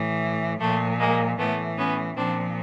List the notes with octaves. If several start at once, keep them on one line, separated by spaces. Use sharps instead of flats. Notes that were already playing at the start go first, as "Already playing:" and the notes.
Already playing: A2 E3
A#2 F3 A3
G#3 A#3
A2 E3 A3 B3
B3 C#4
A#2 F3 C4 D4